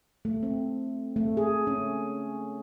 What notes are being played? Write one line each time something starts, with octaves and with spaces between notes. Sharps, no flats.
A3
C4
A3
G#4
C#4